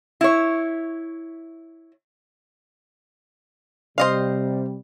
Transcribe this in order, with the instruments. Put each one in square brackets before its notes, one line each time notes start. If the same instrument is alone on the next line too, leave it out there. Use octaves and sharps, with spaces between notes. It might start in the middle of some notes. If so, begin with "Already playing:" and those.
[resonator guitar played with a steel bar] E4 C#5
[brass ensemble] C3 G3 [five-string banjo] C5 D#5 F5